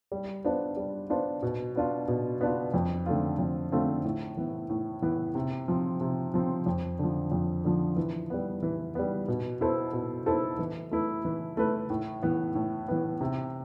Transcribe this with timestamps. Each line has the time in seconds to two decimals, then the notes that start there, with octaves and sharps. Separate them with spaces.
0.12 G3
0.44 B3 D4 F4 C5
0.77 G3
1.10 B3 D4 F4 C5
1.43 B2
1.76 B3 D4 F4
2.08 B2
2.41 B3 D4 F4
2.74 F2
3.06 D3 A3 C4 F4
3.39 F2
3.72 D3 A3 C4 F4
4.05 A2
4.37 E3 B3
4.70 A2
5.02 E3 B3
5.35 C3
5.68 F3 C4
6.01 C3
6.34 F3 C4
6.66 F2
6.99 D3 F3
7.32 F2
7.64 D3 F3
7.97 E3
8.30 G3 B3
8.63 E3
8.95 G3 B3
9.28 B2
9.61 B3 E4 A4 C5
9.93 B2
10.26 B3 E4 A4 C5
10.59 E3
10.91 A3 E4 B4
11.25 E3
11.57 A3 E4 B4
11.90 A2
12.23 E3 B3
12.55 A2
12.88 E3 B3
13.21 C3